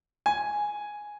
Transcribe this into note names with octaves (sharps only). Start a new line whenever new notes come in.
G#5